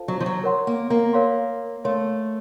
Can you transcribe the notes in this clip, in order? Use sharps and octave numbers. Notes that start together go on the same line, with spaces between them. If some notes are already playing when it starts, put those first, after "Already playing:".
Already playing: F4 A4 C5 F5 A5
F#3
F3
F#3
A#4 C#5 F#5 C6
A#3
A#3
A#4 C#5 F5 C6
A3 A#4 C#5 F5 C6